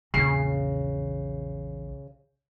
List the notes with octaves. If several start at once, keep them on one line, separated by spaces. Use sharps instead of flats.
A#1 E2 C#3 C7